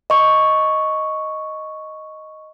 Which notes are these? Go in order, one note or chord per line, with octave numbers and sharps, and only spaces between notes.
D#5 C#6